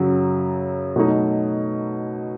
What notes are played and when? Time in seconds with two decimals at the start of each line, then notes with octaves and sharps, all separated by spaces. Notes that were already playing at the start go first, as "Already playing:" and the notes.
Already playing: F#2 C#3 F#3
0.96 B2 F#3 A3 D#4